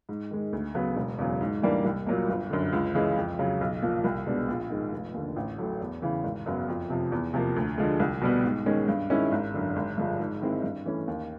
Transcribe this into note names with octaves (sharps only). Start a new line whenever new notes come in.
G#2
D#3 G#3
D2
C#3 F#3 B3
E1
E2 C#3 F#3
G#2
E3 G3 A#3 D4
C2
A#2 F#3 A#3
G1
F#2 D3
C#2
C#3 E3 G#3
F2
C#3 F#3
B1
A#2 F3
C2
B2 G#3 B3 D4
A#1
G#2 D#3 G#3
F1
D#2 D3
A1
A2 F#3 A3
E2
C#3 E3
G#1
F#2 C#3 F#3 B3
F2
C3 F3
E2
C3 F3 A#3
D2
D3 F3 G#3
C2
B2 G3 B3
G#2
D#3 G#3 C#4
G2
D#3 G#3 C#4 E4
G#1
F#2 D3
G#1
G2 D3 F3 G#3
G#2
D#3 G#3 C4 E4
G2
E3 A3 C#4
D#2